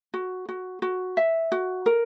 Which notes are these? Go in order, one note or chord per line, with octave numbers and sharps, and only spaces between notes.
F#4
F#4
F#4
E5
F#4
A#4